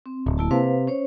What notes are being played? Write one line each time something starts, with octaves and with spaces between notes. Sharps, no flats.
C4
D1
A#3 E4 A5
C3 B4 C5 F5
C#4 C5 C#5